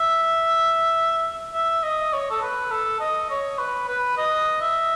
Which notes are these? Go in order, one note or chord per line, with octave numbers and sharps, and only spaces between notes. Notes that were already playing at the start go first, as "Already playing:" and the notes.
Already playing: E5
E5
D#5
C#5
A4
B4
A4
D#5
C#5
B4
B4
D#5
E5